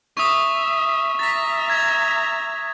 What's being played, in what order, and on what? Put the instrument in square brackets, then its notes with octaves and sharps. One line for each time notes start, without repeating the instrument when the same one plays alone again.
[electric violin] E5 [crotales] C#6 D#6
[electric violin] E5 A#5 [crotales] A6 B6
[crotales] G#6 A6